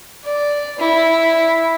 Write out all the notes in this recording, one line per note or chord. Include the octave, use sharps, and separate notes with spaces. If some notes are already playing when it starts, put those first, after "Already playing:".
D5
E4